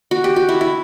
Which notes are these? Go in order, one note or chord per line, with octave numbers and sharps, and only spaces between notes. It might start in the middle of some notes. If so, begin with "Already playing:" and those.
F#4
G4
F#4
E4
E4